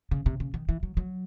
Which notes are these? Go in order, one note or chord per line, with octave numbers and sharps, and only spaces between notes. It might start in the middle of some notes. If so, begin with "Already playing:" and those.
C#3
C3
C#3
D#3
E3
F#3
F#3